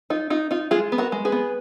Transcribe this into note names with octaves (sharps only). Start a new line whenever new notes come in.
D#4 F4
D#4 F4
D#4 F4
G#3 F4 G#4
B3
F#4 A#4
G#3
G#4 B4
B3